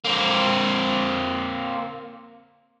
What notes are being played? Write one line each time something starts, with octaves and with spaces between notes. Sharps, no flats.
A#3 C4